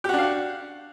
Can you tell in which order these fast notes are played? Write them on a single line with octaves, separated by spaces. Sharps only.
G4 F#4 D4 F5 F#5